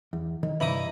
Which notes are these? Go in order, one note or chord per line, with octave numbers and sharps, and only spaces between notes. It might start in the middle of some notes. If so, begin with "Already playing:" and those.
E2
D#3
C2 G2 E3 D#4 B5 D#6